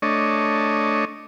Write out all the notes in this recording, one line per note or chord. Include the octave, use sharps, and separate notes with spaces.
A3 D4 C#5 D#5